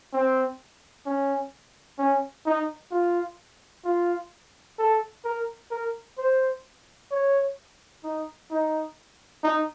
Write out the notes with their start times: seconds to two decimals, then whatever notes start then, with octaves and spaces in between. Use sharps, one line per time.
0.13 C4
1.06 C#4
1.98 C#4
2.46 D#4
2.91 F4
3.85 F4
4.79 A4
5.25 A#4
5.71 A#4
6.18 C5
7.11 C#5
8.04 D#4
8.51 D#4
9.43 D#4